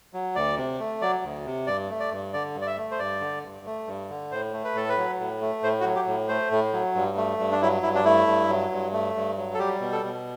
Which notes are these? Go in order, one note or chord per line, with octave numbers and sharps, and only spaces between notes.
F#3
D2 D5
C3
A3
F#3 D5
D2
C3
G2 D5
A3
D5
G2
D3 D5
G2
D5
E5
A3
C5
G2 D5
D3
G2
A3
G2
D3
A2 C5
A3
B4
A2 A4
B4
F#3
A2
A3
A2 C5
F#4
F#3
G4
A2
A3 C5
A2
F#3
G2
A3
G2
D4
F#3 E4
G2 E4
D4
A3 E4
G2
F#3
G2
A3
G2
F#3
A4
G3 G4
B2
A4
B2